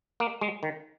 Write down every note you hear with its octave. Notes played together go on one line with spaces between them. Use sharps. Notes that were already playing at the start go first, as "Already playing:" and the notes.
A#3
G#3
D#3